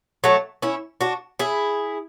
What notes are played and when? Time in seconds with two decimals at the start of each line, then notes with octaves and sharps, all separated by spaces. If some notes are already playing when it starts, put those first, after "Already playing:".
0.24 F#3 A3
0.62 C#4 E4
1.01 D4 F#4
1.39 E4 G#4